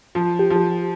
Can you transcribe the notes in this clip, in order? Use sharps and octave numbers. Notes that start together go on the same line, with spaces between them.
F3
G4
F3